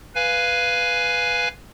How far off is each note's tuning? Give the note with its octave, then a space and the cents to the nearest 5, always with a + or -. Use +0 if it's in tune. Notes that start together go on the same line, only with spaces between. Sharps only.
B4 +0 F5 -5 G#5 +0